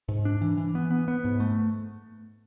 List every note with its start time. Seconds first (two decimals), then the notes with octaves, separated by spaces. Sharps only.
0.09 G#2
0.25 D4
0.42 E3
0.57 E3
0.75 B3
0.91 B3
1.08 B3
1.25 G#2
1.40 A3